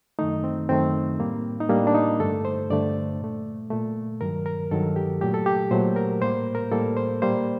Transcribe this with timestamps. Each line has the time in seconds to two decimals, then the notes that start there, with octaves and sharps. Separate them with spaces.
0.19 F#2 D#3 A3 D#4
0.44 C4
0.69 F#2 D#3 A3 C4
1.19 A2 G3 A#3
1.60 D#4
1.69 A2 G3 A#3 D4
1.87 D4
1.94 D#4
2.20 G2 D3 A3 A4
2.45 C5
2.70 G2 D3 A3 D5
3.20 A#2 A3
3.70 A#2 A3
4.21 G2 D#3 F#3 A#4
4.46 A#4
4.71 G2 D#3 F#3 A4
4.96 G4
5.21 A#2 F#3 A3 G4
5.34 A4
5.46 G4
5.71 A#2 F#3 A3 C5
5.96 A#4
6.21 A2 G3 A#3 C5
6.55 A#4
6.71 A2 G3 A#3 A4
6.97 C5
7.22 A#2 G3 A#3 C5